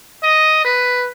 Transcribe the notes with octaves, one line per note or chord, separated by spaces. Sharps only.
D#5
B4